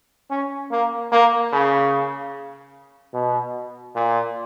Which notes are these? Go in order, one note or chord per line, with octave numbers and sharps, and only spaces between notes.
C#4
A#3
A#3
C#3
B2
A#2